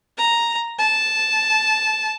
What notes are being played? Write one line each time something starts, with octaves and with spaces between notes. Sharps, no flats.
A#5
A5